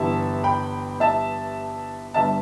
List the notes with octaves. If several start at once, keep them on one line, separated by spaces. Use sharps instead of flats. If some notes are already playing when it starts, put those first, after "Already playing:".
Already playing: G1 G2 E3 E5 A5
G5 B5
E5 A5
G1 G2 G3 E5 A5